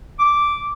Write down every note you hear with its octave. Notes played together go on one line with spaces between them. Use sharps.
D6